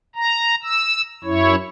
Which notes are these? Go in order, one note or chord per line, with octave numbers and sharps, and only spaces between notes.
A#5
E6
F#2 E4 C#5